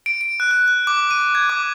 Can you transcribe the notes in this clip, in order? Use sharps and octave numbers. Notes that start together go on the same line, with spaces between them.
D7
D7
F#6
F#6
F#6
D6
D#7
G#6
D6